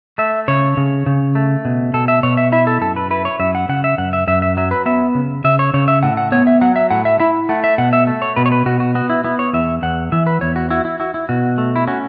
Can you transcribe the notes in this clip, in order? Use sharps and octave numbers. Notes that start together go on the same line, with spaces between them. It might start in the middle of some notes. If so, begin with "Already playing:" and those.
A3 E5
C#3 C#5
C#3
C#3
A3
B2
B2 A4
E5
B2 C#5
E5
E4 E5
A4
F#2 A4
B4
E4 B4
C#5
F#2 E5
F#5
C#3 F#5
E5
F#2 F#5
E5
F#2 E5
E5
F#3 E5
B4
B3 E5
C#3
C#3 E5
C#5
C#3 C#5
E5
A2 F#5
F#5
B3 C#5
E5
F#3 F#5
E5
A2 F#5
E5
E4 E5
A3 F#5
E5
B2 F#5
E5
A3
C#5
B2 B4
C#5
B4
B2 F#4
F#4
B3 F#4
E4
B3 E4
C#5
E2 E5
E2 F#5
E3 E5
B4
E2 C#5
F#4
E4 F#4
E4
E4 F#4
E4
B2 F#4
A3
E4
C#4 F#4